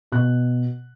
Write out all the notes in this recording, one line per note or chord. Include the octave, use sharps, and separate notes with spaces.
B2 F#6